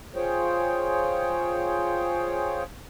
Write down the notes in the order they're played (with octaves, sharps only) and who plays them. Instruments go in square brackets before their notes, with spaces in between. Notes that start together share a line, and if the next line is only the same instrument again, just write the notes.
[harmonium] F4 G#4 C5 C#5 G5